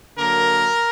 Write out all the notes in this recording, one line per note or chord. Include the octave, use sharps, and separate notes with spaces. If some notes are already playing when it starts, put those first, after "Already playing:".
D3 F#3 A#3 A#4